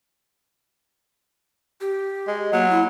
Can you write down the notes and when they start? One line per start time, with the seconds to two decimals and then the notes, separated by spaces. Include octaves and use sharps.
1.81 G4
2.28 G#3
2.53 F#3 A#3
2.70 E4